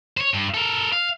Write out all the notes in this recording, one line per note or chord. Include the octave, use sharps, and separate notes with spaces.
C5 C#5
G2
A4 A#4
F5